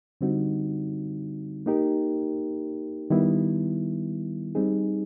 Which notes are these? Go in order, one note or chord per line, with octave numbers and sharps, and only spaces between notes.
D3 G3 C4 D#4 F#4
A#3 D#4 G4 A#4
D#3 G3 B3 E4
G3 C4 D#4 G#4